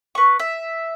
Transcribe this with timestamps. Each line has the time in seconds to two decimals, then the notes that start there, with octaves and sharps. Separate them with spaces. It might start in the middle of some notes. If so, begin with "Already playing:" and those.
0.15 B4 C#6
0.39 E5